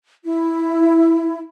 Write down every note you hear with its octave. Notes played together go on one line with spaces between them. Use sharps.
E4